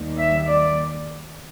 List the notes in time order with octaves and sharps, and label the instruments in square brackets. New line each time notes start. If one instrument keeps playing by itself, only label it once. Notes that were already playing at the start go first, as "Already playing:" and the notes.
Already playing: [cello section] D#2 D#3 G3 A#3
E5
D5